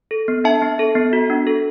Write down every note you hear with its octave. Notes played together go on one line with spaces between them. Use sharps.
A4
B3
D4 E5 A5
B3
A4
B3
F#4
D4
A4